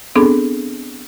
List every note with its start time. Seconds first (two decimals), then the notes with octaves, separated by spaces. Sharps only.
0.16 B3 C4 D4 G#4 A4